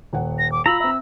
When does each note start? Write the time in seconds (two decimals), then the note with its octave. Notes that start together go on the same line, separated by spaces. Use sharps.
0.13 D#1 F#5
0.39 A#6
0.52 D6
0.66 F4 A#5 B5 E6
0.80 C4 E5 E6